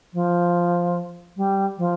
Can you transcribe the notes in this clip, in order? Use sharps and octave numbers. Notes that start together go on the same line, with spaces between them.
F3
G3
F3